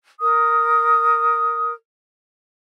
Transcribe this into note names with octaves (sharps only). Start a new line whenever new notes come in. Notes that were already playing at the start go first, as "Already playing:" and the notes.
A#4 D#6